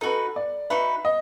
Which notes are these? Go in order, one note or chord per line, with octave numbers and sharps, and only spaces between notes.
D#4 F#4 A4 B4
D5
D#4 F#4 B4 E5
D#5